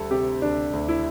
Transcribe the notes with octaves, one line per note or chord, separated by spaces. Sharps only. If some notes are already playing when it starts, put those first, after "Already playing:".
Already playing: D2 G3 A4
C3 G4
D2 D4
D2
E4